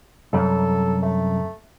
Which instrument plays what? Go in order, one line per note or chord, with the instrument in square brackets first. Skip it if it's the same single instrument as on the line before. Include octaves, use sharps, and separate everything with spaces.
[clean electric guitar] C2 F#2 [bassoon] A4
[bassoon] A3